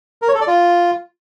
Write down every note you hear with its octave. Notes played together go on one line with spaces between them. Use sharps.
A#4
C#5
A4
D5
F4